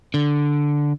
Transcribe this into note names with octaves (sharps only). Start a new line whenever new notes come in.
D3